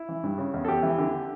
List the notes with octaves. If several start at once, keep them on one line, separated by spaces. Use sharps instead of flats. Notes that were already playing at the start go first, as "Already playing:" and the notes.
Already playing: E4
E3
G2
C#3
E2
A4
E2 G4
E3
D3